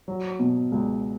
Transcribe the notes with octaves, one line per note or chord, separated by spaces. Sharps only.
F#3
B2
C#2